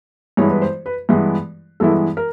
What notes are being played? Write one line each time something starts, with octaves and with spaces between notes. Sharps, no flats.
G2 E3 G#3 B3 E4 C#5
B4
C5
B4
G2 E3 G#3 B3 E4
G2 E3 G#3 B3 E4 A4
A#4